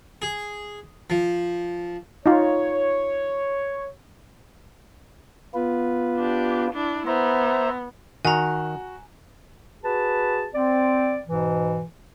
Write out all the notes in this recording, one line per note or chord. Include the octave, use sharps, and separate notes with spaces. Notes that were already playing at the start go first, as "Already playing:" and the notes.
G#4
F3
D#4 F4 C#5
B3 F4 B4
D4 G4
D4 E4
B3 C5 E5 A#5
D#3 F#4 G#5 A#5
F#4 G#4 B4 A5
C4 D5
G#2 B2 E3